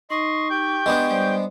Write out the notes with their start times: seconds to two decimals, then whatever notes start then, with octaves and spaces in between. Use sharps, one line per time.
0.10 D#4 D#5 C6 C#6
0.50 G4 G5 G6
0.86 G#3 B3 D4
1.10 G3 C5 D5